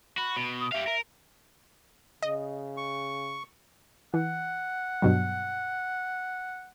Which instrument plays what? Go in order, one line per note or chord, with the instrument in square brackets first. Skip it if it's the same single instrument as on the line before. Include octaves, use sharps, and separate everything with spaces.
[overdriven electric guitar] F#4 [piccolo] B5
[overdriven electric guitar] B2
[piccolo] D#6
[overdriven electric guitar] G4 F5 [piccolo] E5
[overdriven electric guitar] A#4
[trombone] C#3 [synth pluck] D#5
[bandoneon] C#6
[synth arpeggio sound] E3 [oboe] F#5
[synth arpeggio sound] G2 B2 F#3